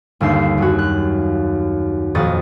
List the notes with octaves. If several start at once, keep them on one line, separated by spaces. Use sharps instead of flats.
G1 D#2 E5 C7
F#2 F#4
F#6
D#1 F2 F#4 D#5 A6